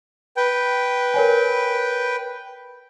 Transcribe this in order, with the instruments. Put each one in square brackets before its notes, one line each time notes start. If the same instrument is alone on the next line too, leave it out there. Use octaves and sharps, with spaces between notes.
[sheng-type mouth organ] B4 G5
[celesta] A#4 C#5 G#5